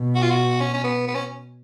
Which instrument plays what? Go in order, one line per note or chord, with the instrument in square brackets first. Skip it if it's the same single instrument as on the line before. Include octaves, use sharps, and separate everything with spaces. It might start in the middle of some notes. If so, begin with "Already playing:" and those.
Already playing: [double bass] B2
[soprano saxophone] F#4
F4
F#4
C#4
C#4
B3
B3
C#4